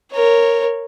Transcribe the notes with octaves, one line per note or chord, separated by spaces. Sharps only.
A#4 C#5